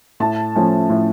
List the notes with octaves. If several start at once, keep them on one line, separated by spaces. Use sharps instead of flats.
A2 A5
F3 A3 C#4
A2